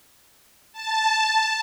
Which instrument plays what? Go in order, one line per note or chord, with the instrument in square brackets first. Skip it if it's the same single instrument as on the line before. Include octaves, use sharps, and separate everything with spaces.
[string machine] A5